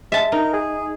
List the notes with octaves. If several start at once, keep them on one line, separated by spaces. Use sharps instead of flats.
G#3 E5 A5
D#4 A#4
G#4